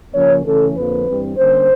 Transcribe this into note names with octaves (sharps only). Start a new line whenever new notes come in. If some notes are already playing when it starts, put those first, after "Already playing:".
C#3 F3 A#3 C#4 C#5
C#3 E3 A3 C#4 A4
F2 D3 F3 A#3 B4
G2 E3 G3 C4
D3 G3 A#3 C#4 C5